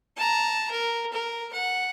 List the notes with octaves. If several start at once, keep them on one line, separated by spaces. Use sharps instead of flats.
A5 A#5
A#4
A#4
F#5